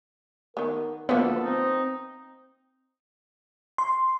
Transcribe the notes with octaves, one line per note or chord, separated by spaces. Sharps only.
D#3 B3 A#4
D2 F3 A#3 B3 A4
C4 D#4
C6